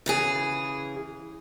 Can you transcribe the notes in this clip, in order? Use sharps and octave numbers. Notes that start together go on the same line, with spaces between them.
C#3 E3 G#4